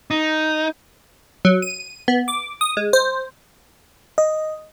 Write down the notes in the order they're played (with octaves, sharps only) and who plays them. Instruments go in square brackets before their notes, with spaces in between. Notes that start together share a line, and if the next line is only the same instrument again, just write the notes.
[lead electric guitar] D#4
[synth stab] F#3
D#7
B3
D6
D#6
G#3
C5
[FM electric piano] D#5